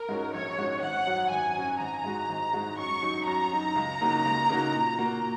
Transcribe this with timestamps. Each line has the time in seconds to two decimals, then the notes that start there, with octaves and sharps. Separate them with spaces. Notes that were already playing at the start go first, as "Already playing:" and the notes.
Already playing: A#4
0.09 G#2 G#3 C#4 F#4
0.33 A#1 C#5
0.58 G#2 G#3 C#4 F#4
0.82 G#1 F#5
1.07 F#2 F#3 C#4 F#4
1.31 G#1 G#5
1.56 F#2 F#3 C#4 F#4
1.80 G#1 A#5
2.04 G#2 G#3 F#4
2.29 G#1
2.53 G#2 G#3 F#4
2.78 F#2 C#6
3.03 F#3 D#4
3.27 F#2 A#5
3.51 F#3 D#4
3.76 C#2
4.01 C#3 A#3 D#4 F#4
4.25 C#2
4.49 C#3 A#3 D#4 F#4
4.74 A#2
4.99 A#3 F#4